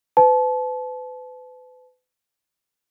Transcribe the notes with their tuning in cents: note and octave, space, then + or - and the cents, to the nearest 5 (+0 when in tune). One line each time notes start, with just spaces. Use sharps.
B4 +35 A5 -30